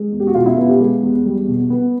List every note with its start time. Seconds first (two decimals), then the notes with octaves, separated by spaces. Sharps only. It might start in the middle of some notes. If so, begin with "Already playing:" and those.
Already playing: G#3
0.12 E2
0.20 G4
0.27 F#4
0.35 B2 F4
0.46 E4
0.57 B3 F4
0.69 G4
0.80 G#3 G#4
1.03 E2
1.26 G3
1.48 B2
1.70 B3